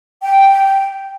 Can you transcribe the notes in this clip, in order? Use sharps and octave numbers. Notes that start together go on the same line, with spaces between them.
G5